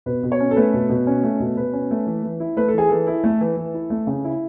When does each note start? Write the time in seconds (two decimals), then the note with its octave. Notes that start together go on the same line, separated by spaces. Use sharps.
0.06 B2 B4
0.23 B2
0.32 C#5
0.40 C#4
0.51 A4
0.56 A3 B4
0.74 B2
0.89 B2
1.07 C#4
1.23 A3
1.40 B2
1.57 B2 B4
1.73 C#4
1.91 A3
2.07 E3
2.24 E3
2.40 E4
2.57 A3 B4
2.68 A4
2.74 E3 G#4
2.89 E3 A4
3.07 E4
3.24 A3
3.41 E3
3.57 E3
3.74 E4
3.90 A3
4.07 C#3
4.24 E4